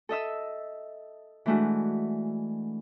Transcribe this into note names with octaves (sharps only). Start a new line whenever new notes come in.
A4 D#5 E5 E6
E3 G#3 A3 D4 F#4